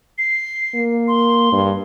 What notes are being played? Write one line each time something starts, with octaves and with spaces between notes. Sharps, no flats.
C7
A#3
C6
G2